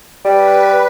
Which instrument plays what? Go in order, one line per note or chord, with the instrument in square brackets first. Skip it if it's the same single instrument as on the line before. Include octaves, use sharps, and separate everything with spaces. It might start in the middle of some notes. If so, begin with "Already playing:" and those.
[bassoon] G3 [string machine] B4